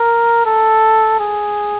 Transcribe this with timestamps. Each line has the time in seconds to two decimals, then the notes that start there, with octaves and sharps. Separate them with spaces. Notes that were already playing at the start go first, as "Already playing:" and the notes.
Already playing: A#4
0.46 A4
1.19 G#4